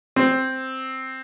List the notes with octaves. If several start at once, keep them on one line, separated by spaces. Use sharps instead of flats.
C4